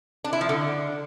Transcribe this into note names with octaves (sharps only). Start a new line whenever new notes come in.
D4
E4
F3
D3